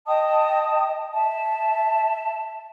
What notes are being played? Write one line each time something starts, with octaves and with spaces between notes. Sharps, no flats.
D#5 G5 A5 D#6
E5 A5